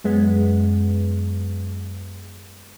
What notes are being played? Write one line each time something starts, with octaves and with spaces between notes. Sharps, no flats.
F#2 G#3 B3